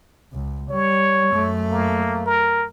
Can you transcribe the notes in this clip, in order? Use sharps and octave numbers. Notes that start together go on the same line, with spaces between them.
C#2
G3 C#5
F#2 A3
A#3
A#4